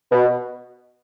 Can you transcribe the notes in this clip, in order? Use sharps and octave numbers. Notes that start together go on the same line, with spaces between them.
B2